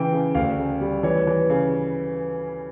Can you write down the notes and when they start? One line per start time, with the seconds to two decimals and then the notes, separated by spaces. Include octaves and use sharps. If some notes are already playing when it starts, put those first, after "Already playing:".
Already playing: C#3 E3 G5
0.13 C#3
0.35 D2 F5
0.58 C#3
0.81 G3
1.03 E3 C#5
1.27 E3
1.50 C#3